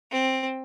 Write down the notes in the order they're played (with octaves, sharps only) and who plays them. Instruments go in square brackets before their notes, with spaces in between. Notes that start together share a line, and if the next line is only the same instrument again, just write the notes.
[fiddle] C4